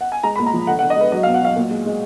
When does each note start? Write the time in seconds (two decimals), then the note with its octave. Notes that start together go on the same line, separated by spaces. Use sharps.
0.01 F#5
0.12 G#5
0.23 G#3 A#5
0.36 A#2 B5
0.46 A#5
0.53 F3
0.67 D3 F#5
0.79 F#5
0.83 D3
0.90 D#5
0.97 G#3 B4
1.12 F#3 D#5
1.23 F5
1.26 B2
1.34 F#5
1.41 F#3 F5
1.56 A#2
1.71 G#3
1.86 G#3